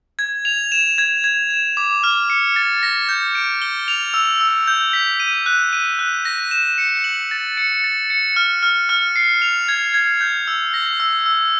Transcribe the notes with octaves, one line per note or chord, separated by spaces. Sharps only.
G#6
F7
E7
G#6
G#6
E7
D6
F6
C#7
A6
A#6
G6
D7
G7
F7
E6
E6
G6
B6
D#7
F#6
D#7
F#6
A#6
E7
C#7
F#7
A6
C#7
A6
C#7
F6
F6
F6
C7
F7
G#6
G#6
G6
E6
A#6
E6
E6